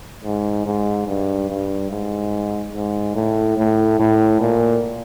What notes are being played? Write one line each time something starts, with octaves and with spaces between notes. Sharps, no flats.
G#2
G#2
G2
G2
G#2
G#2
A2
A2
A2
A#2